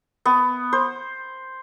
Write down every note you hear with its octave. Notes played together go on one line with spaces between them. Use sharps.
B3
C5